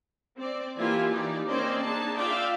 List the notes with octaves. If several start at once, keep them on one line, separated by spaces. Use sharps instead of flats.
C4 D5
E3 A#3 E4 F4 G4 G#5
E3 D#4 G4 D5
A#3 C4 C#4 C5 D5 D#5
D4 D#4 G#4 A5
F4 D5 E5 F5 G5